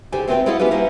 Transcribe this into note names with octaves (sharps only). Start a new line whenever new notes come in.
C#3 G4 A4 C5 G#5
A3 C4 F4 B4 C5 G5
E4 F4 A4 D#5 F5 F#5
B3 C#4 E4 G4 B4 C5
G3 A#3 C#4 D#4 E4 C5